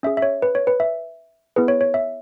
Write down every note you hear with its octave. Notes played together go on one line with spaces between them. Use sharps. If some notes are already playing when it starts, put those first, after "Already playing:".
C#4 G#4 E5
E5
C#5
B4
C#5
B4
E5
B3 E4 G#4 B4
C#5
C#5
E5